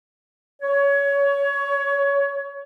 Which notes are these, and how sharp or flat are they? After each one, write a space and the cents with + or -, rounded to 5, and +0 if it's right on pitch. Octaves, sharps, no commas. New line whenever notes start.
C#5 +20